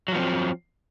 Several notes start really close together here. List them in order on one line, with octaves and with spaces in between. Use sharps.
F#3 F3 B3 C4